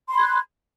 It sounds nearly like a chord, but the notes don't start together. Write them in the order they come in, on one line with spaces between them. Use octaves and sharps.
C6 B5 G#6 F#6